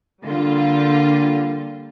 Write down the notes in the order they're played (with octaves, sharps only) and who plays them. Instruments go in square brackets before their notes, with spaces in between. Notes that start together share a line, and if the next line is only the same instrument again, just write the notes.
[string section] D3 G3 A#3 F4